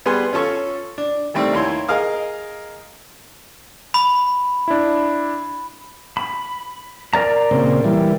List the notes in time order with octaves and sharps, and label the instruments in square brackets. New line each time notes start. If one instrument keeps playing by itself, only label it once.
[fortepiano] G3 B3 G#4 B4 G#5 C6
C#4 F4 A4 C#6
D4
D#3 G3 A3 C4 D4
D#2 E4 C#5 C6
G#4 A#4 D#5 F5 D#6
[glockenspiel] B5
[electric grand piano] D4 E4
[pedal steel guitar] B5
A#4 D5 A#5
[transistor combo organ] A#2 C#3 C4
E3 G3